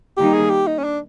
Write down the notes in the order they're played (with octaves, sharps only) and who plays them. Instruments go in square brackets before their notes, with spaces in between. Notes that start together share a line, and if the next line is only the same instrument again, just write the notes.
[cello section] D#3 G3 A#3 D#4 [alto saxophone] G4
[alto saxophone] G#4
G4
D#4
C#4
D4